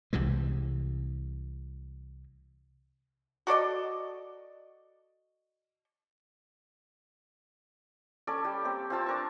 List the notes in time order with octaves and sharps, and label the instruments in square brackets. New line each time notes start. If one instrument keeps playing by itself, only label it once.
[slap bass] C2 C3 E3 G#3
[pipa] F#4 A4 D5 D#5
[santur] C#4 A4 D5
G3
A#3 C4
C4 F4 A5 E6
D4 A#4 C#6